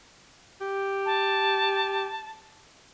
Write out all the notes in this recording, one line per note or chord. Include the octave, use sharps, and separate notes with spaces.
G4
A5